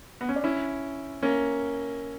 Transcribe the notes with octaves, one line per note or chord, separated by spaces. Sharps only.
B3
C#4
D4
C#4 E4
A#3 C#4